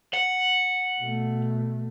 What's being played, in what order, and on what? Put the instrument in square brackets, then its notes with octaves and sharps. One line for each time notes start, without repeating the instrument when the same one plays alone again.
[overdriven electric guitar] F#5
[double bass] B2 A3